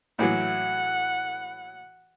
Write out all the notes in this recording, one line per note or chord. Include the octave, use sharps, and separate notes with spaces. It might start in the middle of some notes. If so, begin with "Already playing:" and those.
A2 E3 F#3 F#5